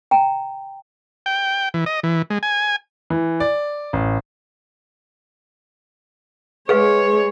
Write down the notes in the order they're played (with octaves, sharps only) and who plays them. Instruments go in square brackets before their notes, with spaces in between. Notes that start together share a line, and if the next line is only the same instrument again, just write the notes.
[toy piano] G5 A#5
[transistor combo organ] G5
E3
D#5
E3
G#3
G#5
[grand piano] E3
D5
A1
[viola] G#3 C#5 [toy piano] G#4 B4 F5